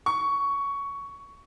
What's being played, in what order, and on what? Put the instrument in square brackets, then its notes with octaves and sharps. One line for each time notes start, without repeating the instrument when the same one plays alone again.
[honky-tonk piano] C#6